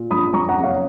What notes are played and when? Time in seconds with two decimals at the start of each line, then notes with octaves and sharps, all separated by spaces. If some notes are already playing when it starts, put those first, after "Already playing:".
Already playing: A#2
0.11 A#1 B5 D#6
0.33 F2 A#5 C#6
0.49 F#5 A#5
0.56 F#1
0.64 C#5 F5